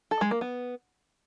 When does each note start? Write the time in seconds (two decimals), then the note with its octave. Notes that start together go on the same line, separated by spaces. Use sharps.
0.11 A4
0.21 G#3
0.31 A#3
0.41 B3